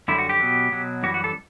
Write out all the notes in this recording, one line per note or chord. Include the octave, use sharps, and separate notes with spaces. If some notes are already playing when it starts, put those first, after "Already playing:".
F#2 D3 G3 E4
F#4
G4
B2 F#3
B2 F#3
F#2 E3 G3 F#4
F#4
A4